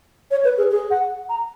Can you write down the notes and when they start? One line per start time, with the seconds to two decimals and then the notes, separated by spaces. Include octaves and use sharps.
0.31 C#5
0.44 B4
0.58 G#4
0.71 G#4
0.91 F#5
1.29 A#5